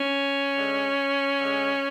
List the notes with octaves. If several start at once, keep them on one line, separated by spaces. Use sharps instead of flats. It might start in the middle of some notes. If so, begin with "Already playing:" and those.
Already playing: C#4
D3 G#3
D3 G#3